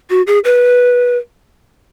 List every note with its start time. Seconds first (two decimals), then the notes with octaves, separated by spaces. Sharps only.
0.10 F#4
0.27 G#4
0.44 B4